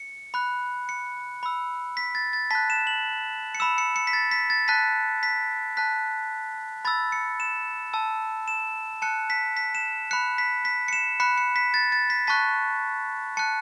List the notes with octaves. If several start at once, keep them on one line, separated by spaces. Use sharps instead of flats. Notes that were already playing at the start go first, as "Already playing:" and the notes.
Already playing: C#7
B5 F#6
C#7
B5 E6
B6
A6
A6
A5 F#6 B6
E7
F#7
C#7
B5 E6 E7
C#7
C#7
B6
A6
B6
A6
A5 F#6 B6
B6
A5 F#6 B6
B5 E6 A6
C#7
E7
A5 E6
E7
A5 F#6 C#7
B6
B6
E7
B5 F#6 C#7
B6
B6
C#7
E7
B5 F#6 C#7
C#7
B6
A6
A6
B6
A5 C#6 F#6 B6
A5 F#6 C#7